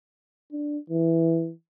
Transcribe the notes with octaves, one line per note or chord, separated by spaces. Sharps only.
D4
E3